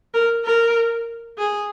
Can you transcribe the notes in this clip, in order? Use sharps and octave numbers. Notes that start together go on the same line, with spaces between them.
A#4
A#4
G#4